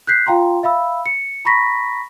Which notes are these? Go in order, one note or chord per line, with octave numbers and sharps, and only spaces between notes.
F#6 G6 B6 C7
F4 F5 G5 A#5 C6
E5 F5 B5 E6
C#7
A#5 B5 C#6 A#6 B6